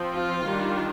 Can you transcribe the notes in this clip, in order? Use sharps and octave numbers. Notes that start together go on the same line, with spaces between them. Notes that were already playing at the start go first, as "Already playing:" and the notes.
Already playing: F3 C4
F4
D#3 G3 D4